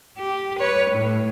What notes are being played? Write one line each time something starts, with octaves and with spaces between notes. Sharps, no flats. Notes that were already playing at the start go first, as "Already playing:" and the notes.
G4
B4 C#5
A2